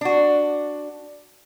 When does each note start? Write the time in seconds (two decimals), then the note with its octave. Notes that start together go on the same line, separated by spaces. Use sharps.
0.01 D4 F#4